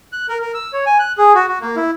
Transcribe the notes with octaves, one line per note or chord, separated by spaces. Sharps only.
F#6
A#4
A#4
E6
C#5
G#5
F#6
G#4
F#4
F#4
A#3
E4